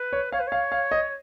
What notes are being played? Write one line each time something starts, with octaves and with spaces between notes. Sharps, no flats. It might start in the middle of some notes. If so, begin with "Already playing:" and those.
Already playing: B4
C#5
C#5 F5
B4
C#5 F5
F5
D#5